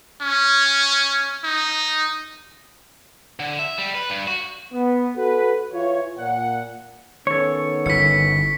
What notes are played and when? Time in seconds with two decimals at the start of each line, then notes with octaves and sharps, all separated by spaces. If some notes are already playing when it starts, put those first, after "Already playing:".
0.22 C#4
1.44 D#4
3.40 D3
3.59 E5
3.78 G3
3.95 B4
4.10 G2
4.28 F#4
4.73 B3
5.17 F#4 A4 B4
5.73 E3 F4 C#5
6.18 A#2 F#5
7.27 D#3 B3 C#4 A4 C#5
7.86 G1 E3 B6 C#7